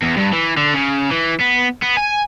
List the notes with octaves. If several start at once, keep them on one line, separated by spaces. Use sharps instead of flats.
E2
G2
E3
D3
C#3
E3
B3
B3
G#5